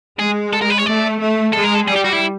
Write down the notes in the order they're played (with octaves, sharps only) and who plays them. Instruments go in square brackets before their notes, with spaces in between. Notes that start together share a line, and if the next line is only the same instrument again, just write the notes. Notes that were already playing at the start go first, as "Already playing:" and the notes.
[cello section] G#3 [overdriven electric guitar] G#4
[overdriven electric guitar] A4
A#4
B4
C#5
[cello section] A3 [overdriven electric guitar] D5
[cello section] A3
[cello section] G#3 [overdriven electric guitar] A4
[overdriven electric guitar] A#4
A4
[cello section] G3 [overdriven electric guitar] G#4
[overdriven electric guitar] G4
F#4
E4